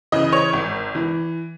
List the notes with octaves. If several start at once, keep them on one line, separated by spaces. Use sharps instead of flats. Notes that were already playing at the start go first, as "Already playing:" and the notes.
C#3 E3 D#5
C#5
G#1
E3